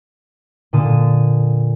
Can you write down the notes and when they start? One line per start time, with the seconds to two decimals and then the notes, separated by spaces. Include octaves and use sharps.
0.73 A#2 D3 A5 D#6 D#7